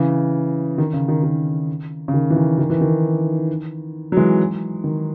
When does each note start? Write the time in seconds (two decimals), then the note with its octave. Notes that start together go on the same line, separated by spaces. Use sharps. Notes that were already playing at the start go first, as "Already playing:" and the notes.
Already playing: C#3 E3
0.78 D#3
0.93 C#3
1.08 D#3
1.23 D#3
2.08 C#3
2.13 D#3
2.30 E3
2.36 D#3
2.58 D#3
2.70 E3
2.81 D#3
4.12 F#3
4.17 E3 G#3
4.84 D#3